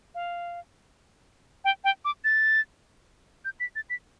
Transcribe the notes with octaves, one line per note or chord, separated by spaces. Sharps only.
F5
G5
G5
D6
A6
G6
B6
A6
B6